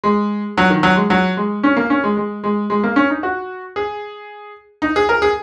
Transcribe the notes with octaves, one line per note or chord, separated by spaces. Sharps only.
G#3
F#3
D#3
F#3
G#3
F#3
G#3
C#4
A#3
C#4
G#3
G#3
G#3
G#3
A#3
C#4
D#4
F#4
G#4
D#4
G#4
A#4
G#4